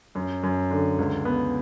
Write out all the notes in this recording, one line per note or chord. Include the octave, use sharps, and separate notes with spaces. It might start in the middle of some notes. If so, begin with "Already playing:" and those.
F#2
F#2
D3
C#2
B3